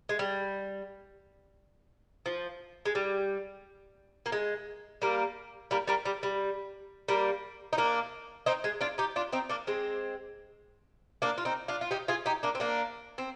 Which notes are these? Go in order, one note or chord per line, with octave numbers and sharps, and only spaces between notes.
G#3
G3
F3
G#3
G3
A#3
G#3
G3 A#3
G3 A#3
G3 A#3
G3
G3
G3 A#3
D#4
A#3 D4
C4 D#4
G#3
D4 F4
D#4 G4
D4 F4
C4 D#4
A#3 D4
G#3 C4
A#3 D4
F4
C4 D#4
D4 F4
F4
D#4 G4
F4 G#4
D#4 G4
A#3 D4
C4
A#3 D4
C4